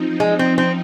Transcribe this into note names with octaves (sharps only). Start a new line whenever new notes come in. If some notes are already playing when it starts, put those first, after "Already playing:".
Already playing: F3 C4 D#4
G#3
C4
C4